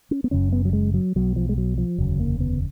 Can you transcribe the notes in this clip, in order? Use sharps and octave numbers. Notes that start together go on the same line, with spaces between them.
C#4
B3
F#1 F#2 C#3 C#4
B3
F#3
G#3
F#3
B1 B2 F#3
F3
G#3
F#3
F3
F1 D#2 C#3 F#3
A#3
B3